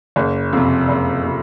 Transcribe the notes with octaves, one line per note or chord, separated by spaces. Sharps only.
F#1
F2 C3
F#1
C3